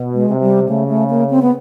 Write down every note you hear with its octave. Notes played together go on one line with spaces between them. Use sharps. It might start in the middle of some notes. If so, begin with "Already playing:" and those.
Already playing: B2
G#3
C3
G3
C#3 A3
A3
A#3
C4
B3